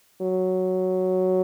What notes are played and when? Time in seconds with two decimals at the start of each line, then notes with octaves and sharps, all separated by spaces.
0.22 F#3